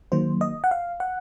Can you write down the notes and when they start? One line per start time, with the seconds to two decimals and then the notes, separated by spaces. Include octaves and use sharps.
0.12 D#3 F#3 A#3 C5
0.41 D#5
0.64 F#5
0.71 F5
1.00 F#5